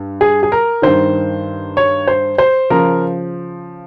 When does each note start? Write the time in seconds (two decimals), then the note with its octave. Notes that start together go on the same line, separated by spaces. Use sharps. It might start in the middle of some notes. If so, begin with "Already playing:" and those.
Already playing: G2
0.21 G#4
0.43 G#4
0.52 A#4
0.82 G2 D#3 C5
1.77 C#5
2.07 C5
2.38 C5
2.70 C#3 F3 A#4